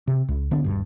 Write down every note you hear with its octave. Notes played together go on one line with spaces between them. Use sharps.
C3
C#2
D3 B3 D4
D#1 G2